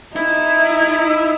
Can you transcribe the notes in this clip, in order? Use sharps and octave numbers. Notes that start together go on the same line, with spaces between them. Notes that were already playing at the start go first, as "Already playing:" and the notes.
D#4 E4